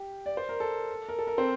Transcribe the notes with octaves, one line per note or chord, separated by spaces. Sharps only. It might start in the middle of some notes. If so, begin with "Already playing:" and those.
Already playing: G4 G5
D5
C5
A#4
A4
A#4
A4
A#4
C4 C5